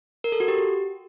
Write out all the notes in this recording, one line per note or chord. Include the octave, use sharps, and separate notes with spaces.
A#4
A4
F#4
G4